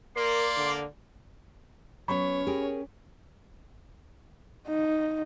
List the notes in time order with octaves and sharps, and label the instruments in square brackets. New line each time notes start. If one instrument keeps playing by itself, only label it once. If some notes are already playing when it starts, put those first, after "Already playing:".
[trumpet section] A#3 D5 [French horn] A#4 [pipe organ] C6
[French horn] D3
[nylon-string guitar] F#3 B3 [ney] C#4 [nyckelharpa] C#5 [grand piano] B5 C#6
[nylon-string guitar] G4 G#4 A#4
[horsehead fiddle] D#4